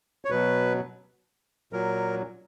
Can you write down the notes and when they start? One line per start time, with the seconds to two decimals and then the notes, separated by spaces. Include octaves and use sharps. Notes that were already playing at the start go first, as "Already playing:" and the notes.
0.25 C#5
0.30 B2 F#3 B4
1.73 A#2 F#3 A#4